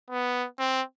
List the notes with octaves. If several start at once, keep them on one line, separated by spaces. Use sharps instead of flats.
B3
C4